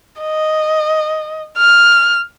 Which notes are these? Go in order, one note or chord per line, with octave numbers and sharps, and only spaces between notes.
D#5
F6